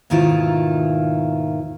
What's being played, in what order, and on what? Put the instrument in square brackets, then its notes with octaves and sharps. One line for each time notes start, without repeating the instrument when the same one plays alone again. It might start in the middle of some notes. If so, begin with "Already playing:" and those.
[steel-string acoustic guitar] D#2 G#2 B2 D#3 E4 F4